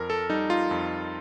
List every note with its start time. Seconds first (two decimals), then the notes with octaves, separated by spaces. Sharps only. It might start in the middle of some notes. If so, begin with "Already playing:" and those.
Already playing: F2 A#4
0.10 A4
0.30 G3 D#4
0.50 F4
0.71 F2